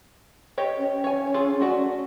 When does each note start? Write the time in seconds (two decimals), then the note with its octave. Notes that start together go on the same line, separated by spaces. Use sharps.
0.58 G4 C#5 D#5
0.78 C#4
1.04 C#5 G#5
1.34 F4 G#4 A4
1.60 A3 F#4 D5